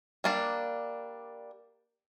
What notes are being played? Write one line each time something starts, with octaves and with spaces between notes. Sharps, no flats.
G3 A#3 D4